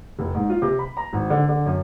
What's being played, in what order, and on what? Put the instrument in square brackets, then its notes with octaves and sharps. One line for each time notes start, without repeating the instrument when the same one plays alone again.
[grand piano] F1
G#2
F4
C3
B5
A#5
G#1
D3
D3
F#2